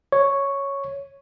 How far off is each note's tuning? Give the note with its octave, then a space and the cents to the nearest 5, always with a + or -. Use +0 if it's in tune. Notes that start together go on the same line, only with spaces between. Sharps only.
C#5 +0 C#6 +0